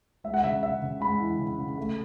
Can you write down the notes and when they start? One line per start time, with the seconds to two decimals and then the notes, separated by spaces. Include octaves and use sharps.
0.24 G#3 E5
0.34 F#5
0.44 C#3 E5
0.63 C#3 E5
0.82 C#3
1.00 G#3 B5
1.20 E3
1.39 C#3
1.58 C#3
1.78 A3